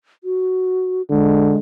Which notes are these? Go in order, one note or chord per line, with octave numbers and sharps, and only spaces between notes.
F#4
D3 G#3